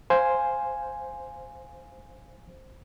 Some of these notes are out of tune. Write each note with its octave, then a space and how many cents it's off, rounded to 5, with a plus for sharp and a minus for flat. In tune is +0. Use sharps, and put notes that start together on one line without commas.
C5 +0 F5 +0 G#5 +0